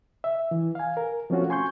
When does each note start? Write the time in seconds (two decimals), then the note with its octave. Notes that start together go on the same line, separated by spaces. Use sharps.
0.24 E5
0.51 E3
0.75 F5 G#5
0.97 A#4
1.30 F3 A3 C4 C#4 F4 F#4
1.50 G#5 C6 C#6 G6